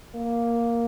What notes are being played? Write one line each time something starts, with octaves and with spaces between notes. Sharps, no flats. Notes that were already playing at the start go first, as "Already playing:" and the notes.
A#3